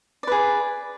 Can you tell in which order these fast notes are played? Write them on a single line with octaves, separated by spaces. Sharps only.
D5 B4 G#4